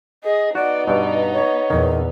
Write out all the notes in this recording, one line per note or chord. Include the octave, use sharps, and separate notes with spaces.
G#4 D#5
B3 D#4 F#4 D5
G2 B2 D5
C#5
E2 A#2 D#3